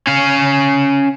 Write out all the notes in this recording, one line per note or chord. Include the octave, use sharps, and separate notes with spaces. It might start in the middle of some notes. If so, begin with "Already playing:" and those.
C#4 F5